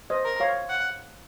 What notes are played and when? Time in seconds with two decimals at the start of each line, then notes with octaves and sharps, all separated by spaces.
0.10 C5 D#5
0.25 A#4
0.40 C#5 F5
0.70 F#5